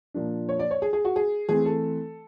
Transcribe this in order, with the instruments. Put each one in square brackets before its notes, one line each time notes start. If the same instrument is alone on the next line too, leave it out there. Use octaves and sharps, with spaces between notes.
[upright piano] A#2 F3 A#3 D4
C#5
D5
C#5
G#4
G#4
F#4
G#4
E3 A3 C4 G#4
A4